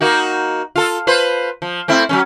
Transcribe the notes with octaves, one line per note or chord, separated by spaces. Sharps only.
A#3 D#4 F#4
F4 A4
F4 B4 C5
F3
A3 C4 E4
F#3 G#3 C#4